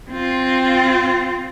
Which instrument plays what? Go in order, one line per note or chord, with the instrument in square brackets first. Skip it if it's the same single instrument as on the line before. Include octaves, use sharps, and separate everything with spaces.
[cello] C4 F4